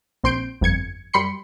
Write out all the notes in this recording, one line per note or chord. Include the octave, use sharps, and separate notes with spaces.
A#1 C4 C6 G6 D7
G1 F2 G#6 C#7
F#2 G3 B5 C6 C#7